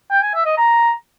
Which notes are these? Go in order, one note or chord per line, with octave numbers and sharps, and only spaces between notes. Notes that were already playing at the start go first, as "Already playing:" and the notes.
G5
G#5
E5
D#5
A#5